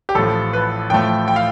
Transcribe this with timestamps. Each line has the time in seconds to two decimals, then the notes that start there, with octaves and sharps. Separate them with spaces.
0.09 G4
0.15 A1 A2 F3 A4
0.53 B4
0.90 A1 A2 F3 A3 G5
1.28 G5
1.36 F5